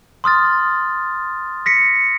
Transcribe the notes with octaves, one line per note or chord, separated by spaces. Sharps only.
C6 D#6 F6 A6
A#6 B6 C#7